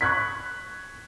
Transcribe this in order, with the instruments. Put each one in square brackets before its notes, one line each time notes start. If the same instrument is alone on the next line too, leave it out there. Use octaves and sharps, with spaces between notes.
[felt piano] C#6 F#6 G#6 B6